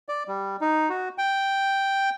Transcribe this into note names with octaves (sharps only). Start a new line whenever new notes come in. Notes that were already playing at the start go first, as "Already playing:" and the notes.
D5
G3
D#4
F#4
G5